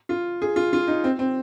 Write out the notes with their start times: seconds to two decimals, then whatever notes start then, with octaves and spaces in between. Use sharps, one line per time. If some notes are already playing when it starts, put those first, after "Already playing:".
0.09 F4
0.42 G#4
0.56 F4
0.73 F4
0.87 D#4
1.04 C4
1.19 C4